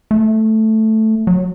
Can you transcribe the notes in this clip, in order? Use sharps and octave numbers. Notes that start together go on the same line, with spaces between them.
A3
F#3